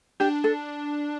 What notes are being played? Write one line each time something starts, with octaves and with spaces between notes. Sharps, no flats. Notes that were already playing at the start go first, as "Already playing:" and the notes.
D4 G4
A4